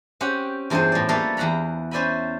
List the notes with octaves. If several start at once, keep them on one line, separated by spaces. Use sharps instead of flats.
C4 C#4 G4 F#5
E2 G2 C4 F4 G#4 C5
A2 D5
G3 A3 A#3 A4 B4 F5
E2 F5 F#5 A#5 B5
C#4 C5 D5 E5 G#5 B5